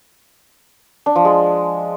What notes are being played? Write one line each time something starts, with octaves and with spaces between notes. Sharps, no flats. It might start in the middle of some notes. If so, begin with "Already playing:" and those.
D4
F3
G#3